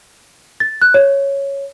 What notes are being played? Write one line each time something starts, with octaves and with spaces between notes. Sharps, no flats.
A6
F#6
C#5